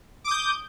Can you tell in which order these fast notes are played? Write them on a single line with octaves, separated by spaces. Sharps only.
D6 D#6 G6